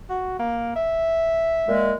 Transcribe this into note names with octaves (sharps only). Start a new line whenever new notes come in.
F#4
A#3
E5
A#2 G#3